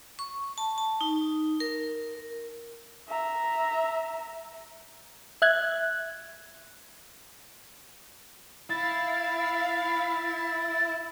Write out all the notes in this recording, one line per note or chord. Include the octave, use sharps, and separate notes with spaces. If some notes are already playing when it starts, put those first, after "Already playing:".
C#6
A5
A5
D#4
A#4
E5 A#5
E5 F#6 G#6
E4 F5 B5 A6